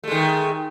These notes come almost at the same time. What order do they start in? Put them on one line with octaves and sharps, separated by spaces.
A3 G#3 D#3